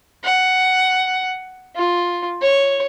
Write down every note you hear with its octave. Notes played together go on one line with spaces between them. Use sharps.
F#5
F4
C#5